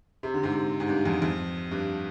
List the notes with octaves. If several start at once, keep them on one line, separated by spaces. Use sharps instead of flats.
C3
D3
G#2 C3
G#2
G2
F2 G#2
F2
G2